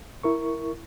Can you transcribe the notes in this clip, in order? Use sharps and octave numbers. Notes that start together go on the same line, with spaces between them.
E4 A#4 C#6